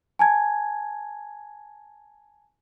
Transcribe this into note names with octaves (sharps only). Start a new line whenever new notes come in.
G#5 A5 G#6